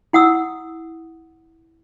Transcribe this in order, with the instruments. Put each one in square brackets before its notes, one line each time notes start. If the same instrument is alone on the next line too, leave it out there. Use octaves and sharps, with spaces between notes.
[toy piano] E4 F#5 D#6 E6